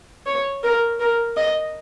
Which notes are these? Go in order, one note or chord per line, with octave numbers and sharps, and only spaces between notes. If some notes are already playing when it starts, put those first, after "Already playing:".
C#5
A#4
A#4
D#5